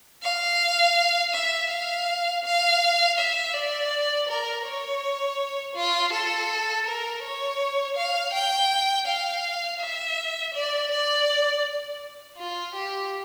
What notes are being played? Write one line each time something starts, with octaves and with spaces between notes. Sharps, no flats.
F5
E5
F5
F5
E5
D5
A#4
C#5
F4
A4
A#4
C#5
F5
G5
F5
E5
D5
D5
F4
G4